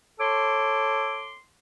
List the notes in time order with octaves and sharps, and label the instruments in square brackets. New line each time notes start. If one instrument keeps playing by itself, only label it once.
[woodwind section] A4 C#5 C6 D6